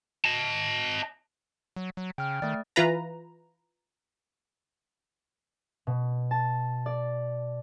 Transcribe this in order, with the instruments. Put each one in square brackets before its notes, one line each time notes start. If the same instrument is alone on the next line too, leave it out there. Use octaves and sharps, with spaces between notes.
[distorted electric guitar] D#5 A5
[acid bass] F#3
F#3
[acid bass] C#3 [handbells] G5 F6
[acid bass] D#3 [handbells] A3 D5
[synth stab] E3 F4 B4 A#5
[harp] B2
A5
D5